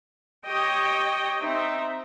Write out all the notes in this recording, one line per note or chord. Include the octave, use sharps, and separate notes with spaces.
G4 C#5 D#5 G5
C4 D#4 E5